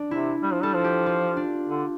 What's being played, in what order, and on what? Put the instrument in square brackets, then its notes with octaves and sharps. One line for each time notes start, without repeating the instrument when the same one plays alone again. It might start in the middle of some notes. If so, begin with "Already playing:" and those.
Already playing: [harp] D4
[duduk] C3 [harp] E4
[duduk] G3
F3
[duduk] G3 [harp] A4
[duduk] F3
[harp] G4
F4
D4
[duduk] D3